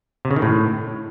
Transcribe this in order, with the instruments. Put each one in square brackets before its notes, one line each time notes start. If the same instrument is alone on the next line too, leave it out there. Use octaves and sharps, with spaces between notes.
[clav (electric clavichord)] C3
C#3
D#3
A2